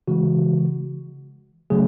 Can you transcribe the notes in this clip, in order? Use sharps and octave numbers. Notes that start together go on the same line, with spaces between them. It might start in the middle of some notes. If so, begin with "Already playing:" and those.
C#3 E3 G#3 F#4
C#3 F#3 A3 G#4